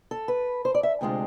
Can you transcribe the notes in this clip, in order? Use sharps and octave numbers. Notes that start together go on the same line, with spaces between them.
A4
B4
C5
D5
E5
D2 C3 G#3 D4 F4